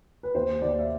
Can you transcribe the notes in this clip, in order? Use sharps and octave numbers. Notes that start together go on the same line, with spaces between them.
B4
D#2 C5
D#2 D5
E5